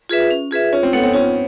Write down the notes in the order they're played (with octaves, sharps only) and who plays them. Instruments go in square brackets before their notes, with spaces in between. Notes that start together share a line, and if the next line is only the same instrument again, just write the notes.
[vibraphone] F4 G#4 B4 E5
C#4
F4 G#4 B4 E5
[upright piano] C#4 [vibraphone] F4
[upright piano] C4
[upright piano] B3 [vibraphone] A4 C#5 F#5
[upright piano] C4
[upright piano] C#4 [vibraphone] F4